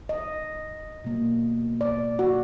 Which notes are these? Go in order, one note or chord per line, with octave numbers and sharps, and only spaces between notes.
D#5
B2 A#3
D5
F#4